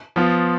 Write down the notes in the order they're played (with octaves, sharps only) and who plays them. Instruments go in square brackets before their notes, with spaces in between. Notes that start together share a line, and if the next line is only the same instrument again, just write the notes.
[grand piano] F3 B3 F4